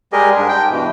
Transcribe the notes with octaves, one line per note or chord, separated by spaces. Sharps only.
G3 G#3 G4 G#4 A#4 D#5
G#2 G#3 D4
G5
G2 B2 E3